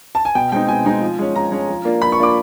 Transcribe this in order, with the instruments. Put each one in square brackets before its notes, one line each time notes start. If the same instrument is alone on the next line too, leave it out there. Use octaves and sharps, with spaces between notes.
[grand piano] A5
G#5
B2 G5
G#3 C4 D#4 G5
B2 G#5
G#3 C4 D#4
F3
G#3 C#4
F3 A#5
G#3 C#4
F3
A#3 D4 F4
F3 B5
C#6
A#3 D4 F4 D6